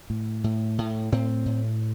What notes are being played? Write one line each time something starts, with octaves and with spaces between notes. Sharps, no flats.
A2
A2
A2
A2 C4
A2